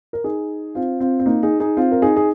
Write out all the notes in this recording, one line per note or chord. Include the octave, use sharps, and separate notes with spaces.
A#4
D#4 G#4
C4 F4
C4 F4
C4
A#3 D#4
D#4 G#4
D#4 G#4
C4 F4
A#4
D#4 G#4
G#4